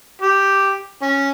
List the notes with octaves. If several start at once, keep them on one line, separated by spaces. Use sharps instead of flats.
G4
C#4